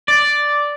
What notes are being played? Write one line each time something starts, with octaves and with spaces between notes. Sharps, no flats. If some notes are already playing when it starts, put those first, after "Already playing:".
D5